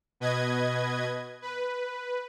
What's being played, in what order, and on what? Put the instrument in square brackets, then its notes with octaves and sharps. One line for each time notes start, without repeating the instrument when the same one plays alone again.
[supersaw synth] B2 B4 D#5 G#6
B4